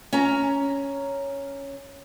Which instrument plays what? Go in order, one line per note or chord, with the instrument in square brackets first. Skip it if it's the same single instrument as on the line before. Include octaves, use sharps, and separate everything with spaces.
[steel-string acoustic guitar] C#4 A#5